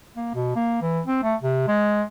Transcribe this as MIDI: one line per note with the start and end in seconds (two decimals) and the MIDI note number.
0.16 0.31 58
0.35 0.51 47
0.56 0.79 58
0.82 1.00 52
1.06 1.20 60
1.23 1.35 57
1.42 1.66 48
1.68 2.03 56